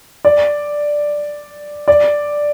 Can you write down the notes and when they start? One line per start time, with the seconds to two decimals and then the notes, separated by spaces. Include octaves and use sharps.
0.25 D5
1.88 D5